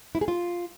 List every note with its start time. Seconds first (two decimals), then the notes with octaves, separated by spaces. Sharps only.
0.15 E4
0.21 G#4
0.28 F4